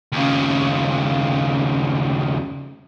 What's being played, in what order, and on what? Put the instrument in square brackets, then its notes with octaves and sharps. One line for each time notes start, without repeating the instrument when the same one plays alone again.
[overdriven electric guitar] D#2 C#3